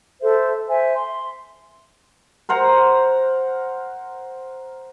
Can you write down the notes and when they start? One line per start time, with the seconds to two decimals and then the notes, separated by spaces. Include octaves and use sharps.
0.21 A4 C5 E5
0.68 C5 E5 G#5 A5
0.94 C6
2.49 A#4 C5 F#5 A#5